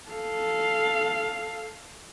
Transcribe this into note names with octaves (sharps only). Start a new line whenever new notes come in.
A4 F5